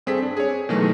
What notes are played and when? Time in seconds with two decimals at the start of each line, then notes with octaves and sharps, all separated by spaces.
0.07 G2 C4 G#4 A4 B6
0.22 D4
0.37 G#4 C#5
0.69 B2 D#3 E3 F#3 G#3 A3